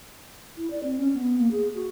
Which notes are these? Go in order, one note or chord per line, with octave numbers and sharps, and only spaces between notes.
E4
D5
C4
C#4
B3
A#3
G#4
F#4